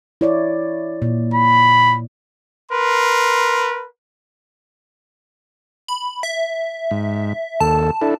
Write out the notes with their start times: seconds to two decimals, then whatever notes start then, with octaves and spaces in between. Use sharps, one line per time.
0.21 E4 C#5 D5
1.02 A#2
1.34 B5
2.71 A#4 B4 C6
5.88 B5
6.23 E5
6.91 G#2
7.60 D#2 A4 A5
8.01 D4 E4 A4